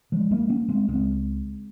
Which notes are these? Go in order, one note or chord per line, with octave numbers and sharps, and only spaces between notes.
F3 G#3
G3 A#3
A#3 C#4
G#3 C4
C#2 C#3 G#3 C4